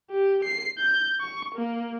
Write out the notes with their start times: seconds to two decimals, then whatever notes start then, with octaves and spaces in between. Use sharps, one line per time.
0.11 G4
0.44 C7
0.78 G6
1.21 C#6
1.55 A#3